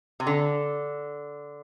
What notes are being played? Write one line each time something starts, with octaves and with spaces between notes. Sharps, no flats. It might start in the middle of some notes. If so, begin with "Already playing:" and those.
C3
D3